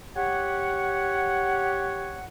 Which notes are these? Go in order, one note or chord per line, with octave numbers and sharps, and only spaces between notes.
G4 C#5 F#5